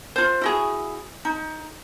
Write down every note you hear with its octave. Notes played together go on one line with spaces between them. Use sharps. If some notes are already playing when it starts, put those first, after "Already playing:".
F4 C5
E4 F#4 G#4
D#4